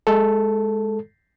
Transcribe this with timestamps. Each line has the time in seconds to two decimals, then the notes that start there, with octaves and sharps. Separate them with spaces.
0.07 G#3 A4